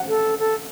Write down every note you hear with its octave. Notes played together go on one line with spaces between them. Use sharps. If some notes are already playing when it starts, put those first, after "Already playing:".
Already playing: F#5
A4
A4